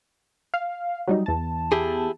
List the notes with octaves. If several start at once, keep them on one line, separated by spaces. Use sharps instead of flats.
F5
F#3 G3 D#4
E2 A5
E4 G4 G#4